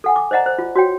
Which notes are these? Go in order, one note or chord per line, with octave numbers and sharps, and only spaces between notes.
A4 F#5 G#5
D6
C5 D5 D#5 F#5 A#5
C5
F4
F#4 C#5 G5